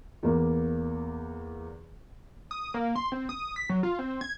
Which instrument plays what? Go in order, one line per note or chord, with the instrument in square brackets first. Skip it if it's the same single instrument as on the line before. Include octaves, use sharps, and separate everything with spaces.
[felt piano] E2 A#3
[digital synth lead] D#6
A#3
C6
C4
D#6
B6
F#3
F4
C4
G#6